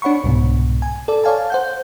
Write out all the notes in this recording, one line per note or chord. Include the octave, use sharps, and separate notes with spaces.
D4 C#5 F#5 B5 C#6
C2 G#2 B2
G#5
A4 D5
C#5 D5 F5 G#5 A5
C5 F#5 G6